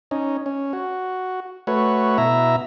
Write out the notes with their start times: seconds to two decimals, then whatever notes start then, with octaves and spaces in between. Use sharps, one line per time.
0.11 C#4 D#4
0.46 C#4
0.73 F#4
1.67 A3 F#4 B4 C#5
2.18 B2 E4 E5 A#5